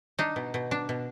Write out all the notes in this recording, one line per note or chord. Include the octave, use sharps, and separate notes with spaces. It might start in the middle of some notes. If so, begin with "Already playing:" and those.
D4 D#4
B2
B2
D4
B2